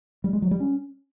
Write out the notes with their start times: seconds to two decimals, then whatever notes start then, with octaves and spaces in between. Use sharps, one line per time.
0.24 G3
0.33 G#3
0.42 F#3
0.51 G3
0.60 C#4